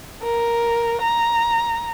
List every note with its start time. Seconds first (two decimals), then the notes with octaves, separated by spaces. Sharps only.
0.23 A#4
1.02 A#5